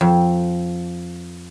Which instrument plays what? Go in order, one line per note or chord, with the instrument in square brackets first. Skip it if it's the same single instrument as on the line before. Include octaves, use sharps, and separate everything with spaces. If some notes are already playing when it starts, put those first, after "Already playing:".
[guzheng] F2